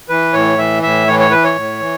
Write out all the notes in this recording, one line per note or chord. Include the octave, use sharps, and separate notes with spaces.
E3 B4
A2 C#5
E3 E5
A2 E5
E3 C#5
C#5
E3 B4
C#5
A2
E3